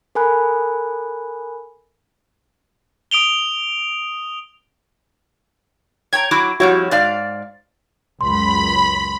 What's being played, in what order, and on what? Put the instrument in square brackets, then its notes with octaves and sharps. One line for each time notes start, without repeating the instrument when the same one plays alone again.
[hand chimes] A4 A#4 G#5 B5 F#6
[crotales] D#6 D7 F7 G7
[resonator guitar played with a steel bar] C#5 A#5 [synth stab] G5 G#6
[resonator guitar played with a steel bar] F#3 E4 F#4 [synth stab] D6
[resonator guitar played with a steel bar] F2 G3 E4 [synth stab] F#4 C#5
[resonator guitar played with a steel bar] G#2 D5 F5
[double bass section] C#2 F#2 [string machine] B5 [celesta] C6